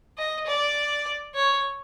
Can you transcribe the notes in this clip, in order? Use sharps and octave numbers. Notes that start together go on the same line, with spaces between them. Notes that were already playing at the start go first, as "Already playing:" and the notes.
D#5
D5
C#5